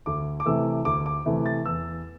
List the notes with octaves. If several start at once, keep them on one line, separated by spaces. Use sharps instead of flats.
D2 D6
D6
C3 E3 A3 E6
D2 D6
D6
C3 E3 A3
A6
E2 E6